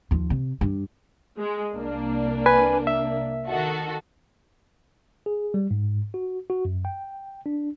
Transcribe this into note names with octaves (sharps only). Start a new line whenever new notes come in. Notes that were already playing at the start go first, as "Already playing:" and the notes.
D#2 F3
C3
G2
G#3
C2 A#3 D4
B4 G#5
E5
D#3 F#4 A4
G#4
G3
G#2
F#4
F#4
F#2
G5
D4